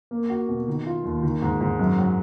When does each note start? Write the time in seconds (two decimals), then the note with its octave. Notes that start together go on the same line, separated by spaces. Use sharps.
0.11 A#3
0.30 F#4
0.49 B2
0.68 D#3
0.86 F4
1.04 D#2
1.23 D#3
1.42 G#2
1.61 G#2
1.79 F#2
1.98 F#3